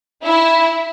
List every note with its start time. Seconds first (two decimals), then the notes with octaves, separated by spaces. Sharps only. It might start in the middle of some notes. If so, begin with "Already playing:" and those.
0.23 E4